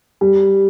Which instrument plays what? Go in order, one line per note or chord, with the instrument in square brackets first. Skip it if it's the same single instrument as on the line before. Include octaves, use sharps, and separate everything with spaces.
[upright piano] G3